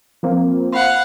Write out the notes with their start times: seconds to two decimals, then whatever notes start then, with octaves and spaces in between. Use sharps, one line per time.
0.23 F3 A#3 C4
0.73 C5 F5 F#5 B5